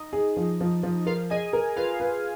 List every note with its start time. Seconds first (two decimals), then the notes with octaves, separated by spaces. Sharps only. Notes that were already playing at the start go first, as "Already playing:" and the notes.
Already playing: D#4 D#5
0.13 G#4
0.37 F3
0.61 F3
0.83 F3
1.06 F4 A#4 F5
1.30 G#4 D#5 G#5
1.53 A#4
1.76 F4 B4 F5
2.00 B4